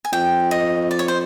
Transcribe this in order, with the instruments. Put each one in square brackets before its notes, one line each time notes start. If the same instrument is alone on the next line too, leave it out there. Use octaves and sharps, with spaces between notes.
[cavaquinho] G#5
[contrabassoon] F2 [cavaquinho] G5
[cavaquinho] D#5
D5
C#5
C5